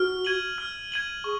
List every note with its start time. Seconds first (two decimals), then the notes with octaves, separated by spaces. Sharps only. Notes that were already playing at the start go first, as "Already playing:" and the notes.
Already playing: F#4 F6
0.25 G#6 D#7 F#7
0.58 F6
0.92 G#6 D#7 F#7
1.24 G#4 C#6